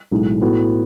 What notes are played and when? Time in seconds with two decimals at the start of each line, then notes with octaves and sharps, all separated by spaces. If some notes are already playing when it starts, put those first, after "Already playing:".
0.11 B1 A2 E3 G#3 D#4
0.41 A2 E3 B3 F#4 A4